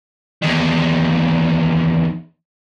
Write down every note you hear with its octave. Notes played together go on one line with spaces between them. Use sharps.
E2 D#3